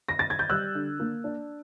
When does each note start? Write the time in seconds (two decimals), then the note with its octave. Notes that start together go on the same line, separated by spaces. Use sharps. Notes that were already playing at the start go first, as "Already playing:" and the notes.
0.09 A#6
0.19 A6
0.30 G#6
0.39 G6
0.49 G3 E6 F#6
0.75 D3
1.00 A#3
1.24 D4